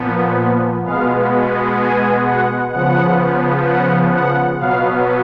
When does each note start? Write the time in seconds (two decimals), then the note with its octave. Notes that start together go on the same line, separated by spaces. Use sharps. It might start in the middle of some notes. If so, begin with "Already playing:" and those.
Already playing: A#2 F3 B3
0.86 B2 G#3 B3 F5
1.80 G#5
2.26 F#5
2.73 C#3 F3 B3 F#5
3.67 F#5
4.13 F#5
4.60 B2 F#3 B3 F5